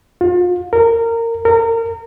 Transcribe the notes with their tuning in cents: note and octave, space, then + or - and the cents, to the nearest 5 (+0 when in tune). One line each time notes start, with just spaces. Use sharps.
F4 +35
A#4 -20
A#4 -30